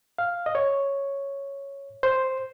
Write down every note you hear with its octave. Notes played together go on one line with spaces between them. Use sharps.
F5
D#5
C#5
C5